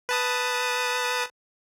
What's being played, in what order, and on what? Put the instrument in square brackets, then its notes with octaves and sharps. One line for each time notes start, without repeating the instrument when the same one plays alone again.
[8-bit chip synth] B4 A5 D#6